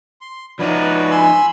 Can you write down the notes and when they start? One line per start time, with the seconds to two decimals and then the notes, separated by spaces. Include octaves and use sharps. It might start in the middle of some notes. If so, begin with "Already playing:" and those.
0.21 C6
0.59 F3 D4 D#4 F#4 B4 C#5 D5
1.11 G#5 B5 C6 E6